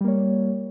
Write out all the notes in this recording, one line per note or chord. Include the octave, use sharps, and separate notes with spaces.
G3 A#3 C#5